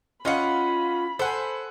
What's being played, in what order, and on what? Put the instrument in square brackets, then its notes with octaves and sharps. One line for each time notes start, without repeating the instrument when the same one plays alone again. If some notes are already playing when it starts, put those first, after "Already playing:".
[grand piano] C#4 D#5 F5 [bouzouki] F4 F#5 [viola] B5
[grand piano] A4 F#5 G#5 [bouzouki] C5